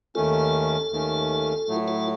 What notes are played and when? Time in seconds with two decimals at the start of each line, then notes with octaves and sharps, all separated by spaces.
0.15 D#2 D#3 A3 C#4 F4 A4
0.91 D#2 D#3 A3 C#4
1.68 A2 F#3 A3
1.88 F4 A4